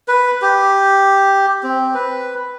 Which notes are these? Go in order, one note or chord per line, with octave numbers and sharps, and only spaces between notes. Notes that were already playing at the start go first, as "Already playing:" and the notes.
B4
G4
C4
B4